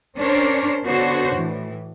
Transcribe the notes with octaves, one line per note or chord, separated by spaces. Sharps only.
C#4 D4 A#4 C5 C#5
D3 B3 D4 F#4 C5 C#5
A2 E3